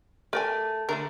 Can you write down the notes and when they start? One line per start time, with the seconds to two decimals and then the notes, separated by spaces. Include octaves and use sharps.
0.33 A3 A#4 D5 G#5
0.89 D3 A3 D4 A#4